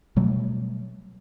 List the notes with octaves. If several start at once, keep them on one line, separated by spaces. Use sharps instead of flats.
B2 F#3 G3 A3